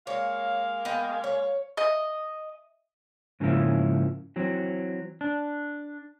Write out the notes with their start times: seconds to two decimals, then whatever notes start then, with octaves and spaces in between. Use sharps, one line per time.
0.07 G#3 A#3 C#5 F5
0.85 B3 D#5 G5
1.24 C#5
1.77 D#5
3.40 G#2 C#3 F3 A#3 C#4 E4
4.36 E3 F#3 C4
5.21 D4